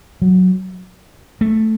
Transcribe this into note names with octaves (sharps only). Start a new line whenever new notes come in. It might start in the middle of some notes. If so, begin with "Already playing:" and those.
F#3
A3